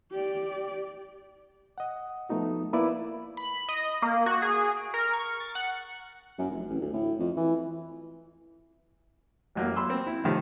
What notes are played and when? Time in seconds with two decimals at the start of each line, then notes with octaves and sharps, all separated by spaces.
0.11 G4 D5
1.78 D#5 F#5
2.29 F3 A3 B3 D#4 F#4
2.73 A#3 B3 E4 B4 D5
3.37 B5
3.69 D#5
4.02 A#3
4.26 F#4
4.42 G#4
4.77 D7
4.94 A#4
5.13 C#6
5.40 A6
5.55 F#5
6.38 F#2
6.51 F1
6.69 A1
6.80 D2
6.93 A2
7.19 F2
7.37 E3
9.55 A1 F#2 A#3
9.76 B5 C6 E6
9.90 C4
10.07 E4
10.24 A2 C3 D#3 F3